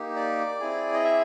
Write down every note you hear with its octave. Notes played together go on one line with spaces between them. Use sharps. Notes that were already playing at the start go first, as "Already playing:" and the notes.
Already playing: A#3 D#4 G4
D5
C4 E4 G#4
D#5
E5